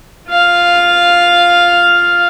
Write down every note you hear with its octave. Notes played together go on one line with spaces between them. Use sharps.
F4 F5